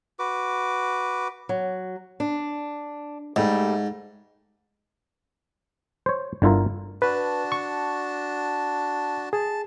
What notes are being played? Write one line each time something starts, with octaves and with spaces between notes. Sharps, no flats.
F#4 B4 D6
F#3
D4
G#2 G3 A3
C5 C#5
G1 D3 E4 F4 A#4
D4 F#4 B4 A5
C#6
G#4 A5